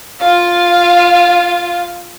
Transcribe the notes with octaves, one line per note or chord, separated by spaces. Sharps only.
F4 F5